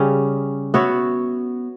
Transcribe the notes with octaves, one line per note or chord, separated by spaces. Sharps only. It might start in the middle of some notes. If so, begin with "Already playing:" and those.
Already playing: C#3 G3 C#4
B3 F#4 C#5 E5